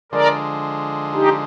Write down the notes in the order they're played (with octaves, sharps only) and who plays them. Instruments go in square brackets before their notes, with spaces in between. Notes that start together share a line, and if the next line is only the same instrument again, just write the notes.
[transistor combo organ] D3 F3 G#3 [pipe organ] A#4 D5
[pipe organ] D#4 G4